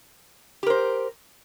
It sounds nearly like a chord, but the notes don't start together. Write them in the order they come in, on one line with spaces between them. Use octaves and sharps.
G4 A#4 C5